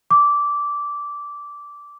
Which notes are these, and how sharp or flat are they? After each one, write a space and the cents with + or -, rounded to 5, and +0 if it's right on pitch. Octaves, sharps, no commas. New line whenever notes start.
D6 -15